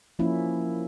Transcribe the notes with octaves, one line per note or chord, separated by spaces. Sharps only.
F3 A#3 C#4 E4